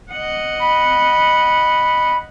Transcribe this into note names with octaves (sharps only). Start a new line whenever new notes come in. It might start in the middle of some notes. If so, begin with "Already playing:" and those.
D#5 F#5
B5